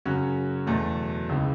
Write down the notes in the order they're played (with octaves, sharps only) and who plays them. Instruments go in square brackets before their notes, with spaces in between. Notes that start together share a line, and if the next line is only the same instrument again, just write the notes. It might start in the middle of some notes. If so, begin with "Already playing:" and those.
[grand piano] F#2 C#3 F#3 C#4 F#4
E2 B2 F#3 A3
C#2 C#3 E3